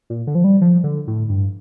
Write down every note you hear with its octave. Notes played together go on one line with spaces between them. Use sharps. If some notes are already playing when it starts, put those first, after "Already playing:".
A#2
D3
F3
G3
F3
D3
A2
G2